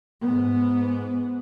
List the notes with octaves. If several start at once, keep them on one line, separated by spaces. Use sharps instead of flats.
G#2 B3